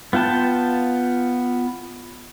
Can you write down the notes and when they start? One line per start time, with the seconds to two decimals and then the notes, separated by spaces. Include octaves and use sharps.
0.13 B3 F4 G5 A5